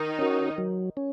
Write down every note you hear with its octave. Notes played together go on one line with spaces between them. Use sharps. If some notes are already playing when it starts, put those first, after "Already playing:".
Already playing: D#3 D#4
C#4 F#4
F#3
C#4